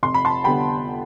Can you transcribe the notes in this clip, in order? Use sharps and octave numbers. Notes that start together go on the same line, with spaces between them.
F1 C6
B5
A5 C6
D3 G3 B3 G5 B5